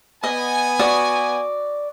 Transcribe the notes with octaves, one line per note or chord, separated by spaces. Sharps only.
B3 D#5 G#5
F#4 D5 D#6